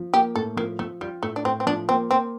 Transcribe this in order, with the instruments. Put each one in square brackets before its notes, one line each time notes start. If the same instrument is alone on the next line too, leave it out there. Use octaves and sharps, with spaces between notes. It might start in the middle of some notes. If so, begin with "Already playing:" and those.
Already playing: [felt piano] F3
[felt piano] A#3 [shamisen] G4
[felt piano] A2 [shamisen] A4
[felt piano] F3 [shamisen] A#3
[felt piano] F3 [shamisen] A3
[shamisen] G3 [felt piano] F4
[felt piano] A2 [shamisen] A3
[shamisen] D4
[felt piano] A2 [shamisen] C4
[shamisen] C4
[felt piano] F3 [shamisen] D4
[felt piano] A#3 [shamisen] C4
[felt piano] A#3 [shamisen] C4